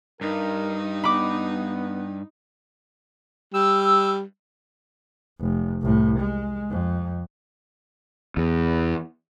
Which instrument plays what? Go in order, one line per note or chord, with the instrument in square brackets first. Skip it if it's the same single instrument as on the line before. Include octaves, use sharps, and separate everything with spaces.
[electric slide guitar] G2 [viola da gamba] D#4 [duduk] A#4
[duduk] B3 [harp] B5 D6
[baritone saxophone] G3 [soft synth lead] E6
[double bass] F1
C2 A2
G#3
F2
[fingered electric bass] E2